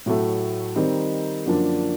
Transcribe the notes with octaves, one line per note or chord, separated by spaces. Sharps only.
A2 F#3 A3
D#3 G3 C4 D#4
F#2 D3 F3 A#3 D4